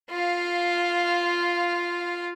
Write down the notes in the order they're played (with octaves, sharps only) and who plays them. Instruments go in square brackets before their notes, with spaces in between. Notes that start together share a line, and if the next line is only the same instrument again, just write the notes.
[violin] F4 F5